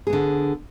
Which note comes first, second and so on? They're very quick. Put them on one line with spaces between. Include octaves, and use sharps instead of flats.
G#4 B3 D3